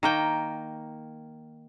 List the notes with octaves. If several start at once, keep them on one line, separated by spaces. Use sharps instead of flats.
D#3 A#3 G5